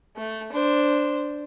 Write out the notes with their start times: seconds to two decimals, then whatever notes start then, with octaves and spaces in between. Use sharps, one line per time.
0.16 A3
0.52 D4 C5